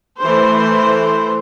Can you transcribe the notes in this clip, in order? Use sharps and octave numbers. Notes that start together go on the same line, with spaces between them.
E3 A3 C5